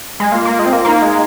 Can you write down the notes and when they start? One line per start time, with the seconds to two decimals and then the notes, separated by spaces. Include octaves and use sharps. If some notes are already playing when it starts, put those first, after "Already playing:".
0.20 G#3
0.32 A#3 F4
0.45 A#3
0.59 G#3
0.66 C4
0.73 A#3
0.85 A#3 D#4
1.02 G#3